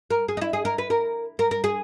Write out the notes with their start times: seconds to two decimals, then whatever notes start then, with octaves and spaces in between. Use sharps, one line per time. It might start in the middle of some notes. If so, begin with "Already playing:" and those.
0.11 A#4
0.28 G#4
0.37 D#4
0.41 E4
0.53 G#4
0.65 A#4
0.78 B4
0.90 A#4
1.39 A#4
1.51 A#4
1.64 G#4